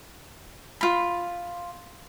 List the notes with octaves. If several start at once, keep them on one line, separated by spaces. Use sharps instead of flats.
F4 B5